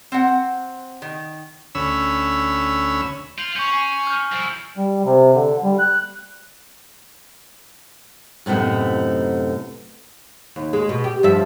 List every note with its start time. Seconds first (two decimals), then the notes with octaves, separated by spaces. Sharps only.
0.12 C4 F#5
1.02 D#3
1.75 D2 C#4 B5 E6
3.38 F4 G6 F#7
3.56 C#4 C#6 G6
3.72 G#5 G6 C7
4.07 F6 G6
4.32 F2 E4
4.77 G3
5.04 C3
5.34 D3
5.63 G3
5.79 F#6
8.46 F#2 A2 C3 B3 D#4
10.56 D#2
10.73 G#3
10.89 B2
11.04 G4
11.23 G2 F3 E5